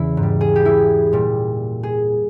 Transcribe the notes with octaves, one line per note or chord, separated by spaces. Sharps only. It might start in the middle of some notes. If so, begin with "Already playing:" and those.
Already playing: E2 C#3 E3 E4
G#2
G3
G#4
G4
E4
A#2 G3
G#4